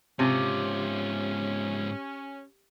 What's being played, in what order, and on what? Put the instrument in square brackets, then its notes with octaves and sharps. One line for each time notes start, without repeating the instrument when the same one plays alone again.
[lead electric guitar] G#2 F4 [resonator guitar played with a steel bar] C3 [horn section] C#4